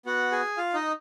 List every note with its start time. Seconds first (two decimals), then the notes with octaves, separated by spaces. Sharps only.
0.06 B3 F#4 F#5
0.32 G#4 G#5
0.57 F4 F5
0.74 D#4 D#5